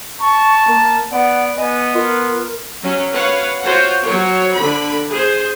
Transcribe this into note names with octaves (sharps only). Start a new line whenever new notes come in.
A5 C#6
A#3
B3 D5 F#5
B3 D#5 G#5
F4 A#4
F#3 C#4
B4 C#5 F5 F#5
F4 F#4 C5 C#5 F#5
F#3 C5 C#5
D3 B5
G#4 C5